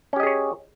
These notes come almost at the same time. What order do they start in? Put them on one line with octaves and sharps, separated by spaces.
C#4 G4 D#5 G#4 C#5